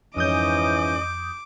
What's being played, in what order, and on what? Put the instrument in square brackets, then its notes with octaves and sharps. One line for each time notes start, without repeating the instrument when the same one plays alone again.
[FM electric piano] F2 D#6 G6 [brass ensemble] G#2 E3 C#4 [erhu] D#5 [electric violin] D6